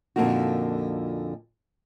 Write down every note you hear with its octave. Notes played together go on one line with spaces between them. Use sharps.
F2 A#2 D3 A#3 D#4 F#4